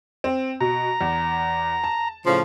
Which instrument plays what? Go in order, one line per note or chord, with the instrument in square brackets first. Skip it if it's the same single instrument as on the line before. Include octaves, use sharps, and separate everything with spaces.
[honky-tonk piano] C4
[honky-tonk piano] B2 [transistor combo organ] A#5
[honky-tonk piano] E2
A5
[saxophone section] A2 C#3 F3